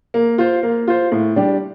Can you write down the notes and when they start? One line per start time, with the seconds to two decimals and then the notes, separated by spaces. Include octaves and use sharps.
0.14 A#3
0.38 F4 C5
0.63 A#3
0.88 F4 C5
1.12 A2
1.36 G3 D4 G4